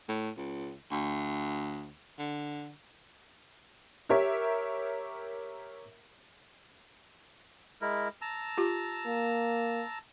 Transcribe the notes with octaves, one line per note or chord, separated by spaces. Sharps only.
A2
C#2
D2
D3
G4 A#4 C#5 E5
G#3 E4 A#4
A5 A#5 E6
F4 G4
A#3